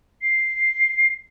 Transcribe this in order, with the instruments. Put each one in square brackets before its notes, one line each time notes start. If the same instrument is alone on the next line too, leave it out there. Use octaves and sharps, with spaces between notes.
[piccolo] C7